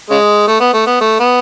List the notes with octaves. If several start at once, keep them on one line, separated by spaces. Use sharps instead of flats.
C#3 G#3
A3
B3
A3
B3
A3
B3